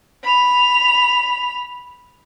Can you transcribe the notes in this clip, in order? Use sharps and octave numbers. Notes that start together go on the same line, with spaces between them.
B5 F7